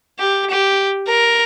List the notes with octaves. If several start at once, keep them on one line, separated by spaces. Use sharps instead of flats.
G4
G4
A#4